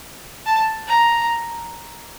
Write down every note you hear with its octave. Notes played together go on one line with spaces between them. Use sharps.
A5
A#5